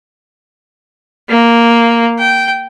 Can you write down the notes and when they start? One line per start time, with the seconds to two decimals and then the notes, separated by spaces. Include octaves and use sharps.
1.29 A#3
2.19 G5